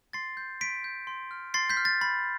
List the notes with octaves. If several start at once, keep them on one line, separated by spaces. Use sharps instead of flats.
C6 A6 C7
G6
C6 B6 D7
G6
C6
F6
C6 A6 C7
G6 B6
F6
A6
B5 A6